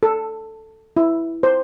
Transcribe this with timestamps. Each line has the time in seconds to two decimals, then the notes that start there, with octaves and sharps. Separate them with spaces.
0.03 A4
0.97 E4
1.43 C5